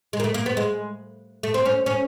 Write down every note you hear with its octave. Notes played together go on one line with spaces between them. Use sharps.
G#3
A#3
A3
A#3
B3
G#3
A3
C4
C#4
C#4